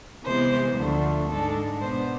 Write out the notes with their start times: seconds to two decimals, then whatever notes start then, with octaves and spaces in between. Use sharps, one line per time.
0.24 C3 E3 G#3 B3 C5
0.76 D2 D3 F3 A3 D4
1.29 G#2 G#3 D4 A4
1.81 B2 B3 D4 C5